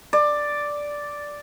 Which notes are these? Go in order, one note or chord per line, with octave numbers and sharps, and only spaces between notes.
D5